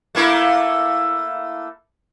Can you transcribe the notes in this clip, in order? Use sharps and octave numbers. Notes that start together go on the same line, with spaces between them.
A3 A#3 E4